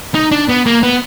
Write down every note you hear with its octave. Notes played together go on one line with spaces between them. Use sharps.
D#4
D4
B3
A#3
B3